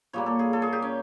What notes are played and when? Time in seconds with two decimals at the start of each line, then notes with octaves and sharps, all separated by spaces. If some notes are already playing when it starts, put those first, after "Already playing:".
0.13 A#2 G3 A#3 C#5
0.26 A4
0.39 G#4
0.53 A4
0.62 G#4
0.73 G4
0.82 C#4